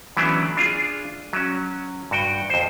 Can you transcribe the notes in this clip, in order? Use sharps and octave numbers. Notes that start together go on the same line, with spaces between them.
E3 F#3 A3 B3 C#4 D4
D4 F4 G#4
F#3 C#4
G2 F#4 G5
F2 C5